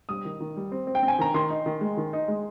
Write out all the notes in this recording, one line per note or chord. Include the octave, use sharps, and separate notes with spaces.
G3 D#6
D#3
D#3
G3
C4
C4
G5
C4
G#5
D#3 A#5
D#3 C6
D#4
D#3
G#3
D#3
D#4
G#3